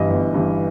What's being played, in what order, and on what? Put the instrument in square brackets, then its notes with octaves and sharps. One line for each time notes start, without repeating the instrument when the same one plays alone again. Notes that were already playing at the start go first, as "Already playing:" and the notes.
Already playing: [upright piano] G1 G2 E3 D#5
G1
G2 E3